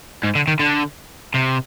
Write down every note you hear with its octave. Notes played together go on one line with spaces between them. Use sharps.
G#2
D3
D#3
D3
C3